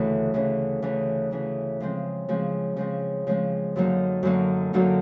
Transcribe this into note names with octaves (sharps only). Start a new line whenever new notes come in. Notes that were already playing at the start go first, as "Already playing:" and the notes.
Already playing: D2 C#3 E3
D2 C#3 E3
D2 C#3 E3
D2 C#3 E3
C#3 F3 G#3 C4
C#3 F3 G#3 C4
C#3 F3 G#3 C4
C#3 F3 G#3 C4
F#2 D3 F#3 A#3 D#4
F#2 D3 F#3 A#3 D#4
F#2 D3 F#3 A#3 D#4